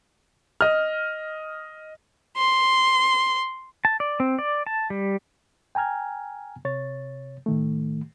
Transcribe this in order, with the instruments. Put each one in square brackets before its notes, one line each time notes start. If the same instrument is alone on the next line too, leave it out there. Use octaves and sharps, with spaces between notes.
[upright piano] D#5 F6
[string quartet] C6
[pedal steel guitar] A5
D5
C4
D5
A5
G3
[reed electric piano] G5 G#5 A#5 F6 G#6
C3 C#5 A6
A2 D#3 A3